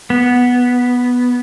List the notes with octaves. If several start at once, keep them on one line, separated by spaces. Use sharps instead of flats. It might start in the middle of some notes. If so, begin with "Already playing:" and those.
B3